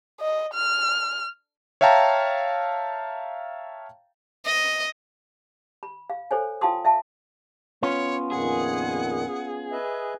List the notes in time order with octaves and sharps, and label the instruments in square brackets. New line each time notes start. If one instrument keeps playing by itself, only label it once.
[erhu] D#5
F6
[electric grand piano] C#5 E5 F5 G5 A5 A#5
[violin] D#5
[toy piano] B5
F5
A4 C5 C#5 G#5
F4 F5 G5 A5 C6 D#6
E5 F5 A5
[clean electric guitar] B3 C#4 F4 [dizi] C#5
[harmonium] F2 A#2 D#3 [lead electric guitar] G#4 [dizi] F#5
[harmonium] B4 D#5 E5